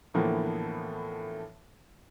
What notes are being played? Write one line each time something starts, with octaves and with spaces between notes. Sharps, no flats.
A2 D3 E3 F3 A#3 B3